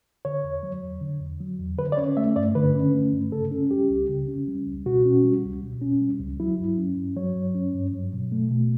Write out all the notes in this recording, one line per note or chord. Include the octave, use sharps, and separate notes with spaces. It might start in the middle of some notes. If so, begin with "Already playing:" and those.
D3 C#5
E2
F#3
E2
D3
E2
F#3
E2
D3 B4
D5
C#4 C#5
A3 E5
G2 D5
D3 B4
C#4
A3
G2
C#3 A4
C#4
G3 G4
C#2
C#3
C#4
G3
C#2
B2 F#4
C#4
G3
C#2
B2
C#4
G3
C#2
F#3 E4
G2
C#4
G2
F#3 C#5
G2
C#4
G2
F#3
B2
A3
B2